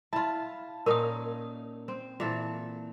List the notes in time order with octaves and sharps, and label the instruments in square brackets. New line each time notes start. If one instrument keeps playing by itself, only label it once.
[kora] E4 F4 [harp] A5
[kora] A#2 C#4 D#4 [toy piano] A#4 D#6
[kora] C4
A#2 E3 A4